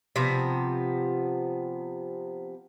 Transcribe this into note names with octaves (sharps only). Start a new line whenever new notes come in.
C3 F3 B3